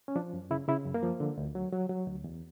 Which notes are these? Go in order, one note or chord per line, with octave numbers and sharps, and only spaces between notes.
C#4
F3 D4
F#2
C#3 E4
C#3 E4
F#2
A#3
F3
D3
D2
F#3
F#3
F#3
D2
E2